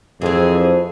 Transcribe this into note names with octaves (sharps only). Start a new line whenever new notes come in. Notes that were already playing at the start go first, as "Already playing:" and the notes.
F2 E3 C4 G#4